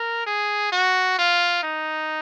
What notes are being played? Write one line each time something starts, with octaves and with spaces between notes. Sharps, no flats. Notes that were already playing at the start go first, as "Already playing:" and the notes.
Already playing: A#4
G#4
F#4
F4
D#4